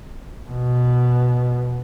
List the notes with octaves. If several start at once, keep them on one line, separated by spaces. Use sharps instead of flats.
B2